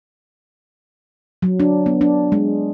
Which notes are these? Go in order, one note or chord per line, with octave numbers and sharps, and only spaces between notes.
F#3
D4
B3
D4
G#3